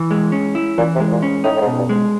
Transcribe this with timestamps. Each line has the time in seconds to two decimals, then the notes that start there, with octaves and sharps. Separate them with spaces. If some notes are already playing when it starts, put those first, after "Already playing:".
Already playing: E3
0.11 G#3
0.32 C#4
0.55 E4
0.78 A#2 E3
0.95 C3
1.00 G#3
1.12 A#2
1.22 C#4
1.44 A2 D#4
1.55 A2
1.61 G#2
1.66 B2
1.77 G2
1.89 G#3